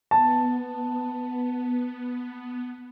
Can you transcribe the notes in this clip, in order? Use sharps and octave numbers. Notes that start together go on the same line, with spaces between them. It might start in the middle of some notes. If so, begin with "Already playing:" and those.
B3 A5